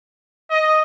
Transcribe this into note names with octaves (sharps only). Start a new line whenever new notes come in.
D#5